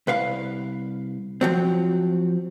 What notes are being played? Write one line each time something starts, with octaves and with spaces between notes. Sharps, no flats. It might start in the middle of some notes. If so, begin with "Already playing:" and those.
C2 B4 F5
F3 F#3 C4